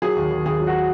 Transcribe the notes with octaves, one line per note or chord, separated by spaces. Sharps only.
F#3 G#4
D#2
D#2
D#2 G#4
F#3
F#4